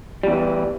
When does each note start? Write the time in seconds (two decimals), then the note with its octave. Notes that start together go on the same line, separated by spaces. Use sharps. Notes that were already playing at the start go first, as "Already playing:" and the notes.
0.23 G3
0.27 E2
0.31 E3